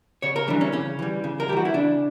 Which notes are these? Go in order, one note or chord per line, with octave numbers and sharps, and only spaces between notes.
C#3 C#5
A#4
E3 G3 D4
C#4
C#3 C#4
E3 G3
C#3
A#4
E3 G3 F#4 G4
E4
C#3 D4